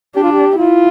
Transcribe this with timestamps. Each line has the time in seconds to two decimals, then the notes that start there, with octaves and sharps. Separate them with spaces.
0.16 D4 G4
0.23 F4
0.32 G4
0.58 E4 F4